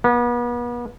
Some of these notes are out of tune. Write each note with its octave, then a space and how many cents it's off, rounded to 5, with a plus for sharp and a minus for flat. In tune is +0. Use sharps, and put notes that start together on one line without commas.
B3 -40